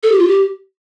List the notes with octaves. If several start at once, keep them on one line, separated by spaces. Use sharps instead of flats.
A4
G4
F4
G4